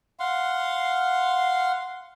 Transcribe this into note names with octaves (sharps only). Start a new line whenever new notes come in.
F5 F#5 C6